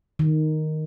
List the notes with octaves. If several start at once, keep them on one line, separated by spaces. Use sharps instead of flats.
D#3